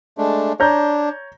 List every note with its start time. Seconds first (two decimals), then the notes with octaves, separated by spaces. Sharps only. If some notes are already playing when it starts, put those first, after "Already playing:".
0.18 G#3 A3 D4
0.60 D4 C#5 A#5 G6